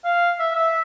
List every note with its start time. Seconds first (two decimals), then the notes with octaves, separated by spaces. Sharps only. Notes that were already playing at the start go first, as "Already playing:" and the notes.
0.05 F5
0.39 E5
0.55 E5